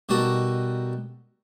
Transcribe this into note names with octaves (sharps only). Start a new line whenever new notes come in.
B2 G3 D#4 F#4 A4 A#4